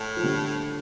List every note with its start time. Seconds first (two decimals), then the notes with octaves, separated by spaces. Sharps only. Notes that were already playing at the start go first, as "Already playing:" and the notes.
Already playing: A2
0.17 F3
0.23 D3 G3